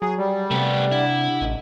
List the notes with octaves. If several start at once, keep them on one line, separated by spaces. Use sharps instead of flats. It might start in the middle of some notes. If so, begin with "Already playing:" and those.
F#3 G#4
G3
C3 A3 B3
D4 E4 F#5
A1 D#5